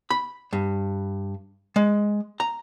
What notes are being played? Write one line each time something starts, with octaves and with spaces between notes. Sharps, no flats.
B5
G2
G#3
A#5